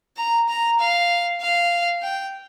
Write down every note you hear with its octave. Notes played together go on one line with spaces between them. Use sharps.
A#5
A#5
F5
F5
G5